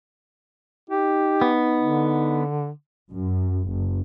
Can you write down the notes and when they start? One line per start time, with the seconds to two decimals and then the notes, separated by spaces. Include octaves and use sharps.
0.90 D#4 G4
1.42 B3
1.80 D3
3.11 F#2
3.69 F#1